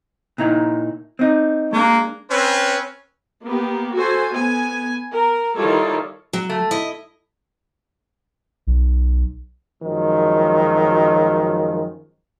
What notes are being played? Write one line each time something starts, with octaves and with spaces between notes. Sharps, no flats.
A#2 D#4 E4
C4 D#4
G#3 A#3 D4
C4 C#4 B4
A#3 B3 G4
F#4 A4 C5 G#5
B3 G#5
A#4
D#3 G3 E4 F4 A4 C#5
F#3
A3
E4 D#5
B1
F#2 D#3 F3 F#3 G#3